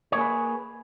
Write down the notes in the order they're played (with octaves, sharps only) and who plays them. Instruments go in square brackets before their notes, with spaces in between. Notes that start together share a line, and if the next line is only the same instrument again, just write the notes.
[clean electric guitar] C#5
A#3
G#4
B4